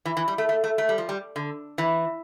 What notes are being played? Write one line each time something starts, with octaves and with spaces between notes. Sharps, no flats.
E3
E3
G3
A3
A3
A3
A3
G3
F3
G3
D3
E3